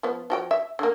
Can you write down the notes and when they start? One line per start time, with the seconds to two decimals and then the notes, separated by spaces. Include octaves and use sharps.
0.03 F3 B3
0.30 F3 F#4 G5
0.51 E5
0.79 D3 A#3